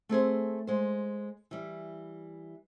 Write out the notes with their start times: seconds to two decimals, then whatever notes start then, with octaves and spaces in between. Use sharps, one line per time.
0.09 A3 C4 G#4 C5
0.67 G#3 C5
1.51 E3 G3